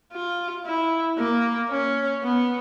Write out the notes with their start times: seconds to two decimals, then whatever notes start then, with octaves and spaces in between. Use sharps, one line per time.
0.13 F4
0.66 E4
1.19 A#3
1.71 C#4
2.23 B3